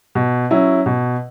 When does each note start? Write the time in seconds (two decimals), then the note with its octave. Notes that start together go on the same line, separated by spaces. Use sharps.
0.15 B2
0.51 F#3 C#4 E4
0.86 B2